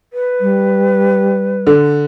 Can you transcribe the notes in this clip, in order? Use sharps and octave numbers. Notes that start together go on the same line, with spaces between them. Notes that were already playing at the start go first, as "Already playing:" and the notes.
B4
G3
D3